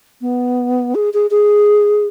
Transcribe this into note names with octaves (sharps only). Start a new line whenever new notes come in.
B3
G#4
G#4
G#4